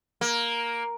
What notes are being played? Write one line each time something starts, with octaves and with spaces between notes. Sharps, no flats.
A#3